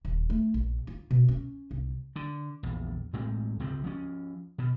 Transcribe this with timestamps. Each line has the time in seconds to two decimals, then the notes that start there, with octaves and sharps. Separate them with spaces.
0.05 D#1
0.30 A3
0.54 A#1
0.87 F4
1.11 B2
1.28 C#4
1.71 C2
2.16 D3
2.63 A#1 E2
3.13 A2 G#3 C4
3.60 C#2 C3 F3 C4
3.84 F3 C#4
4.58 B2